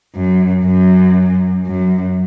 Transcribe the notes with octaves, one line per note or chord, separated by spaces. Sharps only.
F#2
F#2
F#2